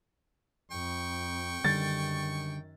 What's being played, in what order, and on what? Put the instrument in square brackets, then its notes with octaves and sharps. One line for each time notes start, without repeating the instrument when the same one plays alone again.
[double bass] F2 [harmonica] G5 C#6
[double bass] F#2 D#3 [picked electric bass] D3 G3 [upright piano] A6